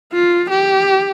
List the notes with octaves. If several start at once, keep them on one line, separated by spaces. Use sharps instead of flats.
F4
G4